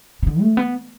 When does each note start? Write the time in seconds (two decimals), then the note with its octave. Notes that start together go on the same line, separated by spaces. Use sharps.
0.23 C3
0.27 D3
0.41 A3
0.57 B3